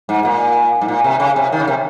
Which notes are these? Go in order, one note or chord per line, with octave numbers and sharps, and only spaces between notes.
G#2
A#2
G#2
A#2
C3
C#3
C3
D#3
C#3
C3